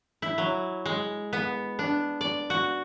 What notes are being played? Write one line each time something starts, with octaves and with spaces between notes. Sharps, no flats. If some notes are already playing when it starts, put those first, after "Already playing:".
E4
F#3
G#3
B3
D4
D5
F#4